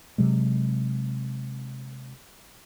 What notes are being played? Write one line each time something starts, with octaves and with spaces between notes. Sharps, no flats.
C3 F#3 G#3